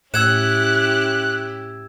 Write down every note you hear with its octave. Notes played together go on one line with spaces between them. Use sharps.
A2 C#4 E4 G4 E6 F#6 G#6 E7